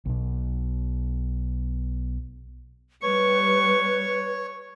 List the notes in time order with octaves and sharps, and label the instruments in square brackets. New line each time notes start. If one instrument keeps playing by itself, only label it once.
[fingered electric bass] B1 B2
[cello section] G3 [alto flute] B4 [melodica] C#5 [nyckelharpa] C#6